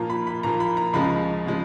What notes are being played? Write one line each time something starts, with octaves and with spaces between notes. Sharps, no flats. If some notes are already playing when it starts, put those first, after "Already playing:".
Already playing: A#2 F3 A#3 F4 A#5
B5
B5
A#2 F3 A#3 F4 A#5
B5
A#5
C#2 C#3 F3 G#3 B5
C#3 F3 G#3